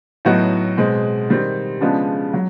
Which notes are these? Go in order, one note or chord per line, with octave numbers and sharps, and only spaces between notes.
A2 F#3 B3 D#4 F#4
B2 G#3 C4
D#3 G3 C4
C#3 F3 G#3 B3 D4
F#3